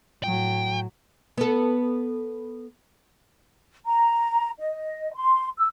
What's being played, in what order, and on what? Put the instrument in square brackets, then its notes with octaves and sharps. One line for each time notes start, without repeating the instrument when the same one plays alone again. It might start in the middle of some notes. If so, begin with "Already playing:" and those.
[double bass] A2 F#3 [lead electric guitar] G5
[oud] B3 A4
[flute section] A#5
D#5
C6
E6